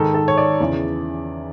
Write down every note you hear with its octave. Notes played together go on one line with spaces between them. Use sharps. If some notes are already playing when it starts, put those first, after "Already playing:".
Already playing: G#2 D#3 A4
A4
C#5
D5
E2 C#3 E3